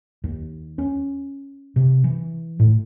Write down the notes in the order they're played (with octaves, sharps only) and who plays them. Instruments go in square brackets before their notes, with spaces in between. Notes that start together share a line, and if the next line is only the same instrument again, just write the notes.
[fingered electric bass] D#2
C#4
C3
E3
A2